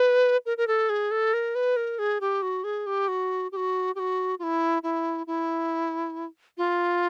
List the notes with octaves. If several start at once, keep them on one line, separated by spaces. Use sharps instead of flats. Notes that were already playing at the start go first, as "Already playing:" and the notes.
Already playing: B4
A#4
A#4
A4
G#4
A4
A#4
B4
A#4
G#4
G4
F#4
G#4
G4
F#4
G4
F#4
G4
F#4
F4
E4
E4
E4
F4